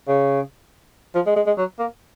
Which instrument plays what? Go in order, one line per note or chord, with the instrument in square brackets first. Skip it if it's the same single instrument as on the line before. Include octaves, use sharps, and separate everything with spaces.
[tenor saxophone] C#3
F3
G#3
G#3
G#3
F#3
A#3